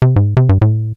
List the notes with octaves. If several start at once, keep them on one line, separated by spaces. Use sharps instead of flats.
C3
G#2
C3
G2
A2